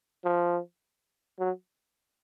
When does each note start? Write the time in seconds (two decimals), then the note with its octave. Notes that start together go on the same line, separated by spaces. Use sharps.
0.25 F3
1.39 F#3